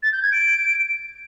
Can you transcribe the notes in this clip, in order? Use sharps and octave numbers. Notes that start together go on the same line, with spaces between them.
A6
G6
G#6
D7